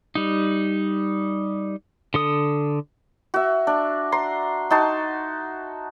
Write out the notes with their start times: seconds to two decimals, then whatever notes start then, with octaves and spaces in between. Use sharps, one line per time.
0.15 G3 D#4
2.14 D3 A4 D#6
3.34 F#4 E5
3.67 D4
4.12 A#5 C6
4.70 D#4 F#4 A5 C6